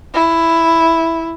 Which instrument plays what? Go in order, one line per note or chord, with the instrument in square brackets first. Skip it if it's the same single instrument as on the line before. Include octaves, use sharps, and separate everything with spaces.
[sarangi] E4